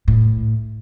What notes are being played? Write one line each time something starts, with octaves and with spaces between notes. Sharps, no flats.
A2